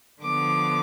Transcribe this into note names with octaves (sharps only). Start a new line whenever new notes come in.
D3 F3 B3 D6